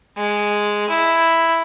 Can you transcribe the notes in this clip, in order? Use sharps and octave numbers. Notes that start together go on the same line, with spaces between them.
G#3
E4